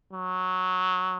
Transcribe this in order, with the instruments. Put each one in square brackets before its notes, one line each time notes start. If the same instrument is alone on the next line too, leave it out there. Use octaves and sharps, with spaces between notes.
[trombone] F#3